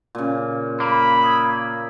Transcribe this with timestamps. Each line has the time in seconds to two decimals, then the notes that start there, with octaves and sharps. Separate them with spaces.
0.15 A#2 C#3
0.80 A#3 B5
1.24 D#6 E6 G#6